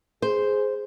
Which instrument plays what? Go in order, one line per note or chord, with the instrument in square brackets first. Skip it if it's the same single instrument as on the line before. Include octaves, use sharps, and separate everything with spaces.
[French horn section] G#4 [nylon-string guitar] C5